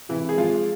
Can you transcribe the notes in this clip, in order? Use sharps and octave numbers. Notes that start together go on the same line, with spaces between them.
C3 E3 E4
G#3 G#4
F3 F4
G#3